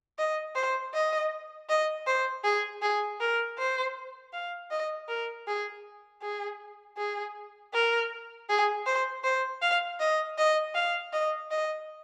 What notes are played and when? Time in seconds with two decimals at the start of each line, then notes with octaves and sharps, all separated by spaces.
0.18 D#5
0.55 C5
0.94 D#5
1.69 D#5
2.07 C5
2.44 G#4
2.82 G#4
3.20 A#4
3.58 C5
4.33 F5
4.71 D#5
5.08 A#4
5.47 G#4
6.22 G#4
6.97 G#4
7.74 A#4
8.49 G#4
8.86 C5
9.24 C5
9.62 F5
10.00 D#5
10.38 D#5
10.75 F5
11.13 D#5
11.51 D#5